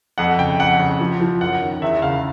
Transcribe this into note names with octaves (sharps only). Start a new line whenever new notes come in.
F2 F#5
C#3 G5
F2 F#5
C#3
F3
F3
F#2 F#5
D#3
E2 E5
C#3 F5